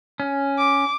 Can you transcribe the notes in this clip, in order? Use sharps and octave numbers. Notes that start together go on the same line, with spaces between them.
C#4
D6